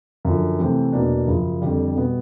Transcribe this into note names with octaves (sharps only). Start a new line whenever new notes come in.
F#2 D3 F3
C3 E3 A3 C4
E2 B2 F#3 A#3 D4
F#2 C#3 F3
F2 D3 G3
B2 G3 B3